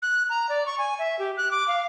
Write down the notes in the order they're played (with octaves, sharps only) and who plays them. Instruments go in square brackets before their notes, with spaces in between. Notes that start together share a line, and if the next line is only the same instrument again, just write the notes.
[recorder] F#6
A#5
D5
C#6
G#5
E5
G4
F#6
D6
F5